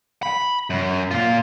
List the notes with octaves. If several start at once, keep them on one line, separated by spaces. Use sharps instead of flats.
B5
F#2
A#2 F4